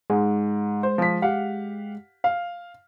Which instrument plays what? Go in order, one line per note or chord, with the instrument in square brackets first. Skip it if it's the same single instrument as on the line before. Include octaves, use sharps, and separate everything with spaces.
[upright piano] G#2 [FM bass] G#3
[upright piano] C5
F3 B6
G4 F5 F#5
F5